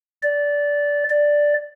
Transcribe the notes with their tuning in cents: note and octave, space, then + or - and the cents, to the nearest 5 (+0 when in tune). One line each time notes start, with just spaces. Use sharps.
D5 -15
D5 +0